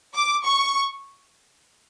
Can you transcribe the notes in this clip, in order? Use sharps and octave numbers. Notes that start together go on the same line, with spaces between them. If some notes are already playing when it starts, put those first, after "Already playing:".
D6
C#6